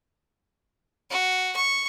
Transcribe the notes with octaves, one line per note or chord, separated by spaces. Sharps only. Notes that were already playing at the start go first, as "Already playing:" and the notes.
F#4
C#6